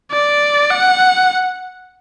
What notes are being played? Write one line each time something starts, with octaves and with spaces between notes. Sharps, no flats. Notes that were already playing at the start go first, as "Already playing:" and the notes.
D5
F#5